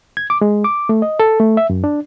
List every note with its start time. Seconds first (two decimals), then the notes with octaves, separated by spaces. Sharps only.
0.17 G#6
0.30 D6
0.41 G#3
0.64 D6
0.89 A3
1.02 D#5
1.20 A4
1.40 A3
1.57 E5
1.70 F#2
1.84 D4